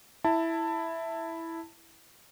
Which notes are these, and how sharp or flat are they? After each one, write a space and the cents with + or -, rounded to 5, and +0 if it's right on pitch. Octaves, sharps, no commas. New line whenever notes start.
E4 +0 A5 +20